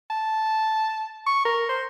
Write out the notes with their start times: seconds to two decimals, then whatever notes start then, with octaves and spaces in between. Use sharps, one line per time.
0.10 A5
1.26 C#6
1.45 A#4
1.69 C5